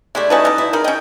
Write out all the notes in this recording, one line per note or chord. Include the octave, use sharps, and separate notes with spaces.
G#3 A3 D4 E4 G4
C#4 D#4 F#4 B4 A5
B2 G3
E4
D#4 G#4 A#4 B5
C#4 D#5 G5